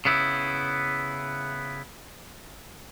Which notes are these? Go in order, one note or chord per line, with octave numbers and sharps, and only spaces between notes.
C#3 B3 E4